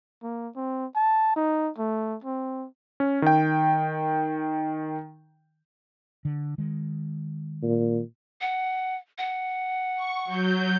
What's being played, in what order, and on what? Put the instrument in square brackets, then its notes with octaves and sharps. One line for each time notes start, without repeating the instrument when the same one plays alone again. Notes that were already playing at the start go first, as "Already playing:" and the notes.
[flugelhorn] A#3
C4
A5
D#4
A3
C4
[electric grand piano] C#4
D#3 G5
[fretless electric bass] D3
D#3 G#3
[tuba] A#2
[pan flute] F#5
F#5
[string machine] C#6
F#3 G6